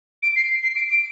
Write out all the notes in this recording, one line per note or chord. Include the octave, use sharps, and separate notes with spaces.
D7
C7
C7
D7
D7